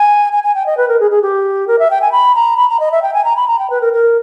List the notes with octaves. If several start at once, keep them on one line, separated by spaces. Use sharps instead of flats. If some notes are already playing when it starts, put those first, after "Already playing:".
Already playing: G#5
G#5
G#5
G5
D#5
B4
A#4
G#4
G#4
G4
A#4
E5
G5
G#5
B5
A#5
B5
A#5
D#5
E5
G5
G#5
A#5
B5
A#5
G5
B4
A#4
A#4